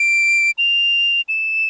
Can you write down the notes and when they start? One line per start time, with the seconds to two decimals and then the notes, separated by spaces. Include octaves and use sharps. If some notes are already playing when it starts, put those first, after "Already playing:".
Already playing: D7
0.58 F7
1.29 E7